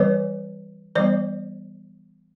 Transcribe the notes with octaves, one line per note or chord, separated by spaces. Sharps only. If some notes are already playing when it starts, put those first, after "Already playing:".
Already playing: E3 G3 C4 B4 C#5
E3 G3 B3 C5 D5